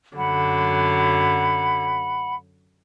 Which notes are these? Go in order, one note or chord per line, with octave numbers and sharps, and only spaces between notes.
F#2 D3 F#3 F#5 B5